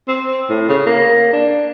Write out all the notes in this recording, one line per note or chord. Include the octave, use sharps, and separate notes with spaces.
C4
A2
C#3
A#3
D4